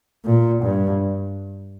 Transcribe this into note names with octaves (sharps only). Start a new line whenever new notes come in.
A#2
G2